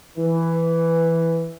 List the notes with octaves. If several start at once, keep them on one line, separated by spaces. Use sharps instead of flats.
E3